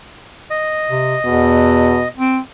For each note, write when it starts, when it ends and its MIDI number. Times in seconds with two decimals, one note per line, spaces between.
0.50 2.08 75
0.89 1.16 48
1.25 1.98 40
1.25 2.04 47
2.18 2.39 60